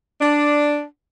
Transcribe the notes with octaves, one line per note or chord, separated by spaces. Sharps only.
D4